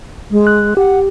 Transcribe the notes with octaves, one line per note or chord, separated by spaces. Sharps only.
G#3
F#6
G4 F#5